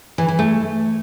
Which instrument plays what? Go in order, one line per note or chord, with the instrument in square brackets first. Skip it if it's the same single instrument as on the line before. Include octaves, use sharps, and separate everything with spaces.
[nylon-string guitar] E3
E3
A3